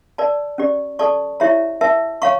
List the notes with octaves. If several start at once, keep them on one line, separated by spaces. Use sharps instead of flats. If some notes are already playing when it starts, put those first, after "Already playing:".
A#4 D5 A5
C#4 G4 D5
A4 D5 A5 C#6
E4 G4 C#5 E5 A#5
A#4 E5 A5
C#5 F5 A#5 C#6